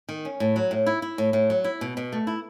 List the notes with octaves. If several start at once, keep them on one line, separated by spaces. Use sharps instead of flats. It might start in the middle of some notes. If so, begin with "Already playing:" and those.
D#3
C#4
A2
F#3
A2
E4
E4
A2
A2
F#3
E4
B2
B2
A3
E4